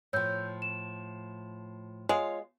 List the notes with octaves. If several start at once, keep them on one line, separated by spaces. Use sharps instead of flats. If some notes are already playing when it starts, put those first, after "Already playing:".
A2 F3 C#5 E6 G6
E7
G#3 F4 C#5 F5